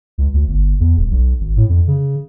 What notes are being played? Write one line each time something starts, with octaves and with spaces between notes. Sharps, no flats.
C#2
D2
G1
E2
D#1
B1
G#1
A2
F2
C#3